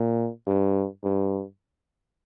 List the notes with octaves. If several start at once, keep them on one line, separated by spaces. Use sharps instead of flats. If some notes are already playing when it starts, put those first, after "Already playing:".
Already playing: A#2
G2
G2